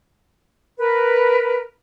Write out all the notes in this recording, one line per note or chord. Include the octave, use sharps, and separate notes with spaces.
A#4 B4